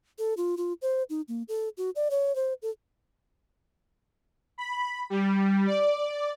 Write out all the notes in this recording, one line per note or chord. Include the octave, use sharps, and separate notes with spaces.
A4
F4
F4
C5
D#4
A#3
A4
F#4
D5
C#5
C5
A4
B5
G3
D5